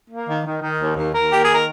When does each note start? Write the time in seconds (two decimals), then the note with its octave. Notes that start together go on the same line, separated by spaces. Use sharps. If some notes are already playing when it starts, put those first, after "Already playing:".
0.10 A#3
0.27 D#3
0.45 D#3
0.62 D#3
0.80 D#2
0.96 D#2
1.13 D#2 A#4
1.31 A#3 G4
1.43 G#4
1.48 D#3
1.55 A#4